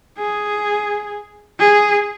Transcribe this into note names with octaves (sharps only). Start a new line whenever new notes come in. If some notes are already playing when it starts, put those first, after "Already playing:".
G#4
G#4